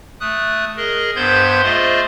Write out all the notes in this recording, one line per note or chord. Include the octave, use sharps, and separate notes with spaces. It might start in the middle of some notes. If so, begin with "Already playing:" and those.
A3 D#6 F#6
G#4 A#4 D#5
G2 B3 C5 C6 G6 G#6
A3 F4 G#4 C5 D#5